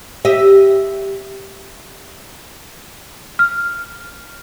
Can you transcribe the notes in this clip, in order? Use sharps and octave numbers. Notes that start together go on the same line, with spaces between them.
G4 D#5 E5
F6